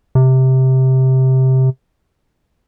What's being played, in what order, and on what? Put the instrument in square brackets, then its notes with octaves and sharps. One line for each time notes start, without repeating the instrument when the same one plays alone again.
[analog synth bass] C3